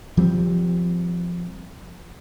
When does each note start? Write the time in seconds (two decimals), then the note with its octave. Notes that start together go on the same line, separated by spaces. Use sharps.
0.17 F3 G3 C4